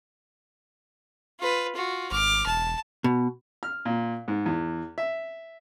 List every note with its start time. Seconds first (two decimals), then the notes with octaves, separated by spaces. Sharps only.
1.40 F4 B4
1.75 F4 F#4
2.11 G#1 D6 F6
2.46 E1 A5
3.04 B2
3.63 F6
3.85 A#2
4.28 G#2
4.46 E2
4.98 E5